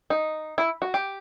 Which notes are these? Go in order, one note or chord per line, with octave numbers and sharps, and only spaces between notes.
D#4
E4
F#4
G4